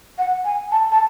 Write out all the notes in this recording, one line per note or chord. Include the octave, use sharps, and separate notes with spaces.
F#5
G#5
A5
A5